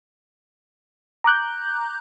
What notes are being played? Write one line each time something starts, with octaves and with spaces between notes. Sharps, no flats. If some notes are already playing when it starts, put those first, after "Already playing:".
A#5 D6 F#6 G6